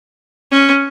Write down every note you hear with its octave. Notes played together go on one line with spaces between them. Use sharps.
C#4